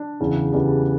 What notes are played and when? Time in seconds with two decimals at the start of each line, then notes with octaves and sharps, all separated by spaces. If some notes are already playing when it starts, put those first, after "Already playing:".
Already playing: D4
0.20 E2 C#3 E3
0.52 E2 C#3 E3 G3